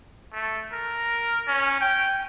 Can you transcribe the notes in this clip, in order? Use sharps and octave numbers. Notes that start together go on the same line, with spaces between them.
A3
A#4
C#4
G5